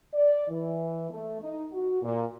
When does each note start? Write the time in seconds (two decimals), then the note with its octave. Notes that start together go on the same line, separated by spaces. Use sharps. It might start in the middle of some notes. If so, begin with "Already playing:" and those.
0.14 D5
0.48 E3
1.10 A3
1.41 D#4
1.72 F#4
2.02 A#2